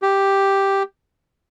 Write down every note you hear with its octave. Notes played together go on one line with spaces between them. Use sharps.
G4